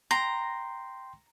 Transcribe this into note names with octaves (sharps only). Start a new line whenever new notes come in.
G5 A#5 C6